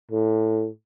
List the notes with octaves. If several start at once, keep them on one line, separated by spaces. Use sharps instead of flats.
A2